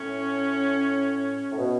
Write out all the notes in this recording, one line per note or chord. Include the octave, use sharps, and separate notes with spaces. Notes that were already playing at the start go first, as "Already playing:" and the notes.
Already playing: A2 C#4
A2
B2